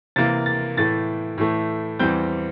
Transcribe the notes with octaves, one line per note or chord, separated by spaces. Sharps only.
C3 E3 A#3 A6
A6
A2 E3 A3 A6
A2 E3 A3
E2 E3 G3 C4 G6